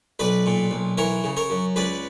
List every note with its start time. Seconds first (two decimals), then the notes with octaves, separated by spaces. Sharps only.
0.19 B1 B4 D5
0.46 A#2
0.71 B1
0.98 E3 A#4 C#5
1.24 C#3
1.37 A#4 C#5
1.50 F#2
1.76 C#2 B4 D5